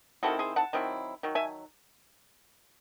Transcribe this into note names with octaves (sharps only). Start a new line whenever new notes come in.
D#3 F#3 C4 E4 F#4 A4
G#4 C5
F#5 A5
D#3 F#3 C4 E4
D#3 F#3
E5 G#5